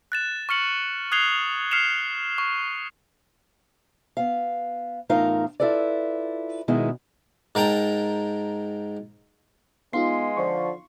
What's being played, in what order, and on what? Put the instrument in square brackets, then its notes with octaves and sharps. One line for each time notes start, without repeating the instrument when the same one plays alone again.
[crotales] F#6 A6 E7
C#6 F6 C#7 F#7
D#6 F#6 G#6 C7 F7 G7
F6 C7 C#7 E7 F7
C#6
[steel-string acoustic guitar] B3 F5
E2 A2 D#4 F4 A#4 F5
E4 F4 A4 B4 D5
B2 D#3 G#3 B3 E4
[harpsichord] G#2 A#4 G5 A5 A#5
[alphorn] G#3 [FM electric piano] B3 D#4 F4 [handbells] F5 C6 C7
[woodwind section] D3 F3 [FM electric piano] C#6